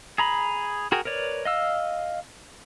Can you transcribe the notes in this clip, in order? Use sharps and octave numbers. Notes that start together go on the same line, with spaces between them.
G#4 A#5 B5
F#4 G#4 A#4 G5
A#4 B4 C#5 D5
D#5 F5 E6